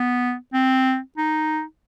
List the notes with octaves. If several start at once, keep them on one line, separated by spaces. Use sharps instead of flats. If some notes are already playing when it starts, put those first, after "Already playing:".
Already playing: B3
C4
D#4